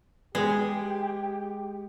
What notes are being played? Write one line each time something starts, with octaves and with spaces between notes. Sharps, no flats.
G#3 B3 G4 G#4 G5